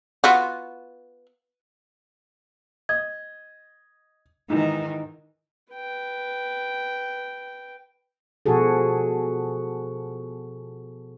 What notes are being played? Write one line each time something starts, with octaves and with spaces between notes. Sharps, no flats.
B3 F4 F#4
D#5 G#6
G#2 D#3 E3 D#4
B4 G5
B2 F3 F#4 G#4 A4